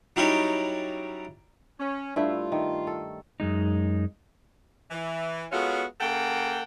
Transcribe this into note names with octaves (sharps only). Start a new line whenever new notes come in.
F#3 G3 C#4 D#4 E4 G4
C#4
G2 A3 E4 F4
D#3
A4
F#2 G#3 D#4
E3
G#3 B3 C#4 F4 F#4 A4
C#3 A#3 A4 F#5 G5